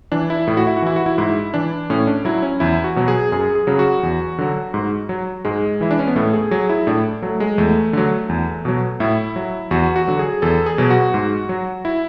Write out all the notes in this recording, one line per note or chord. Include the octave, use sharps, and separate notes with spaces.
E3 D4
E4
A2 E4
F#4
E4
F#4
E3 E4
F#4
E4
G#2 E4
E3 D4
A2 C#4
D4
F#3 E4
C#4
E2 E4
F#4
B2 F#3
G#4
F#2 G#4
G#4
C#3 F#3
F#4
E2
D3 F#3
G#2
F#3
G#2 G#3
E3 E4
D4
C#4
B3
A2 A3
G#4
F#3 G#4
E4
A2 D4
F#3 A3
G#3
E2 A3
D3 F#3
E2
B2 F#3
A2 E4
F#3
E2 F#4
F#4
D3 F#3
G#4
E2 A4
G#4
B2 F#3
F#4
G#2
F#3
E4